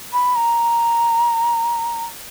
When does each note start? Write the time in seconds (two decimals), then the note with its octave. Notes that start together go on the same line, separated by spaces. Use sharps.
0.13 B5
0.36 A#5